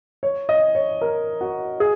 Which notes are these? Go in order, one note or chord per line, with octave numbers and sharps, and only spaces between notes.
C#5
D#5
C#5
A#4
F#4
G#4